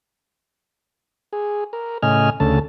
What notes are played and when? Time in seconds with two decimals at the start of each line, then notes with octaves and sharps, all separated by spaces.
1.33 G#4
1.73 A#4
2.03 A2 C#3 D#5 G#5 F6
2.40 D2 C#3 A3 A5